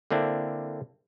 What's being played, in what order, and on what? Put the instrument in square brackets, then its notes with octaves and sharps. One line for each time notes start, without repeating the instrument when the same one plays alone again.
[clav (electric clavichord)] D3 A#3 C4 D4 E4